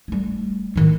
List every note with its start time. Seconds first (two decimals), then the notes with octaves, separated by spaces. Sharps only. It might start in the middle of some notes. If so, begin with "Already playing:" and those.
0.08 G3 A3
0.76 A2 D#3